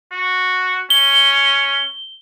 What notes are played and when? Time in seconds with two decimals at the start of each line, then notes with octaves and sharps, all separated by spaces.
0.12 F#4
0.90 C#4 G7